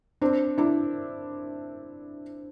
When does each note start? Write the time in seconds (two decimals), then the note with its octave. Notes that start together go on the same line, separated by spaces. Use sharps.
0.22 C4 D4
0.58 D4 E4